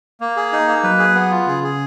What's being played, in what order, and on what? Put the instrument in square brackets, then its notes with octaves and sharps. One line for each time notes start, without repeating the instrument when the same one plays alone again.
[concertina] A#3
G#4
D#4
A#3
[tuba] F#3 [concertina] B4
[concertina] G#4
B3
F4
[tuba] C#3 [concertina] G#4
[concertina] G#4